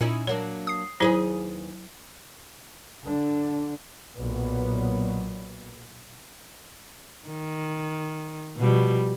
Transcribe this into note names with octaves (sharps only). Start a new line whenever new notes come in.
A#2 C#4 D#4 E4
F#3 A#3 D4 C#5
D#6 C7
D#2 F#3 E4 G#4 B4 C5
D3 D4
B1 A#2 F#3 B3
D#3
B2 F3 G3